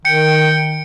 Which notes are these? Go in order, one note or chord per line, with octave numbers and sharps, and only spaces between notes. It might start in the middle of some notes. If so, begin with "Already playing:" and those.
D#3 G5 C#7